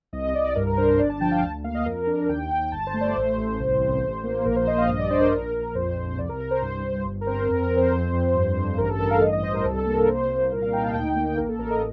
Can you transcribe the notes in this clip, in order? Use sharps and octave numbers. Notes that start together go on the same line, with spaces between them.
C2 D#5
C2 D5
G2 A#4
A#4
D4 C5
C5
G1 D5
A5
F3 G5
F5
D2 A5
A#3 F5
D#5
F2 A#4
D4 A#4
D#2 G5
D#2 G5
G1 A5
C5
A3
D5
A1 C5
A1
C2
C2
A1
A#3
A#1 A#4
C5
A#1 D#5
F5
G2 D#5
D5
D4 C5
A#4
A#1 A#4
A#1
F2 C5
F2 C5
C2 D5
A#4
C2 A#4
C5
G2 C5
G2
G1
A#4
C4 C5
F2 A#4
A#4
C4
C5
F2
F2
G2
G2
A1 A#4
A4
A1 A#4
F5
G2 D#5
D#5
G2 C5
A#4
C2 A4
A4
A#3
A#4
C2 C5
C2
A#2 A#4
F5
D#4 G5
A5
D2 G5
G5
A#3
G5
A1 A#4
A4
A1 A#4
D#5